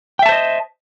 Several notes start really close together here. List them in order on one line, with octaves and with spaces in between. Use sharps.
G5 E5 A5 C5 D#5